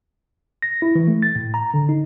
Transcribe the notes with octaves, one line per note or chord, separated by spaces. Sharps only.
A#6
E4
E3
A3
A6
A2
A#5
D3
D#4